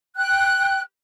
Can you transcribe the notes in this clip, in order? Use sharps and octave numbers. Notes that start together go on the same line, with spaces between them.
G5 F#6